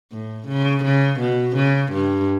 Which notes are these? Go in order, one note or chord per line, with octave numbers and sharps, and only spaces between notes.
A2
C#3
C#3
B2
C#3
G2